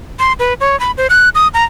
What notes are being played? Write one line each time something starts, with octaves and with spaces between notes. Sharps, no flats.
C6
B4
C#5
B5
C5
F#6
D#6
A#5